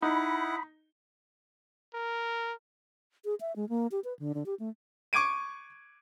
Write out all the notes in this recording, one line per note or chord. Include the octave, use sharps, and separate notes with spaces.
D#4 E4 F#5 B5
A#4
G#4
E5
G#3
A#3
G4
B4
D3
D3
G4
A3
C#6 D6 G#6 D7 D#7